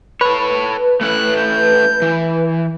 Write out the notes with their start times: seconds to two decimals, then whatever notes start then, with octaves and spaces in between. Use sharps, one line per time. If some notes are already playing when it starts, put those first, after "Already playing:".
0.21 A4 B4 C#5
1.01 A3 C#4 E4 F#6
1.36 G6
2.02 E3